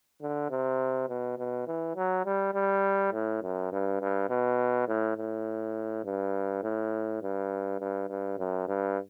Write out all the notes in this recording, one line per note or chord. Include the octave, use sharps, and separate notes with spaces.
D3
C3
B2
B2
E3
F#3
G3
G3
A2
F#2
G2
G2
B2
A2
A2
G2
A2
G2
G2
G2
F#2
G2